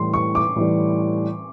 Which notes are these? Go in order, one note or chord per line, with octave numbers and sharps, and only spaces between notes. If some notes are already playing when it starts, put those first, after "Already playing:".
Already playing: A2 E3 G3 C6
C#6
D6
A2 E3 G3